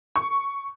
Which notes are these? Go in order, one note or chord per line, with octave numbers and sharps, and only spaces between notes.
C#6